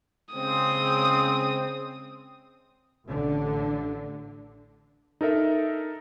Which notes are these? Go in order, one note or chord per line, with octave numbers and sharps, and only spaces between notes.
C#3 G#3 C4 D#6
A1 D3
D#4 A4 A#4 E5